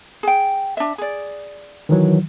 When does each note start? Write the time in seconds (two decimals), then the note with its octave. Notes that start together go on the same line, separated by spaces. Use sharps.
0.23 G#4 G5
0.77 D4 E5
0.98 G#4 D5
1.89 D#3 E3 F#3